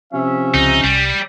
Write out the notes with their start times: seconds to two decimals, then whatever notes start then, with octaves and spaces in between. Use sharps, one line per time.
0.13 C3 F3 C#4 E5
0.54 C#2 D#4
0.84 C2 G3